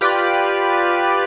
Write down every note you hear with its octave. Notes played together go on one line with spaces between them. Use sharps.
F4 G4 B4 D5